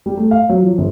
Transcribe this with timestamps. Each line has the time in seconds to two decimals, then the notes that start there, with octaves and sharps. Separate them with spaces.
0.06 G3
0.17 A3
0.31 F5
0.49 F#3
0.62 F3
0.78 G1